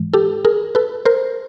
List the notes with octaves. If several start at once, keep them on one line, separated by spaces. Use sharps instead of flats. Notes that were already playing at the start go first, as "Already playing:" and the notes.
Already playing: G#2 E3 G#3
G4 A4
G#4 A#4
A4 B4
A#4 C5